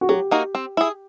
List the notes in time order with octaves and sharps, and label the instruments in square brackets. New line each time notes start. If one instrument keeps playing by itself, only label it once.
[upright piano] F#4
[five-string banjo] F#3 [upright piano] G4
[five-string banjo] A#3 D#4 F#4 A#4
C4
E4 G#4